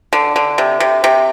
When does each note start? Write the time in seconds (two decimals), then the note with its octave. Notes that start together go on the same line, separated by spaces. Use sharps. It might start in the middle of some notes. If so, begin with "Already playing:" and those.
0.13 D3
0.36 D3
0.58 C3
0.80 C3
1.04 C3